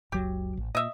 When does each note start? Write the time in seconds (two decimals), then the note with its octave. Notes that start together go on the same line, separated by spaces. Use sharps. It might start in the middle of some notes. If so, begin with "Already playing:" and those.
0.12 F#1 C#2 F#3 G4
0.57 A1
0.75 A#2 D#5 E5